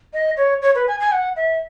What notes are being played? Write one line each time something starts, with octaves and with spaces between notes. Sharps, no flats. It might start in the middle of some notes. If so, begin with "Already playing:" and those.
D#5
C#5
C#5
B4
G#5
G#5
F#5
E5